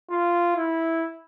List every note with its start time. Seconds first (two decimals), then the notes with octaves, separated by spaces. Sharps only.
0.10 F4
0.57 E4